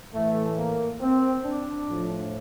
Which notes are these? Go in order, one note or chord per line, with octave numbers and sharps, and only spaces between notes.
A2 E3 A3
A#3
C4
D4
A2 F3